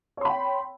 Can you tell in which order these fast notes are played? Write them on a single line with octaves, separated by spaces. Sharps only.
C#5 C6 B5 G5